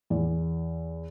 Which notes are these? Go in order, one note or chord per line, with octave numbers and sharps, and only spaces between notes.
E2